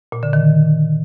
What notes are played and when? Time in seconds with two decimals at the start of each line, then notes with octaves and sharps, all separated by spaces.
0.12 A#2
0.23 D3
0.33 D#3